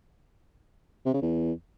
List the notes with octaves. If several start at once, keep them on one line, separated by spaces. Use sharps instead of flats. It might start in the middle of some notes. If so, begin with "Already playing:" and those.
C3
C#3
E2